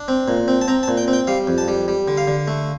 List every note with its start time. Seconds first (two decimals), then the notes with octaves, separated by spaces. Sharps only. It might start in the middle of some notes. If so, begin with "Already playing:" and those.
Already playing: D4
0.08 C4
0.28 A#2
0.48 C4
0.61 A5
0.68 C4 A#5
0.83 A5
0.88 A#2
0.97 G5
1.08 C4
1.13 G5
1.27 G3 F5
1.47 F2
1.58 A5
1.68 G3
1.88 G3
2.08 D3
2.17 F5
2.28 D3
2.48 A3